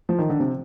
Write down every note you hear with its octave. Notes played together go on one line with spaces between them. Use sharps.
F3
D#3
D3
C3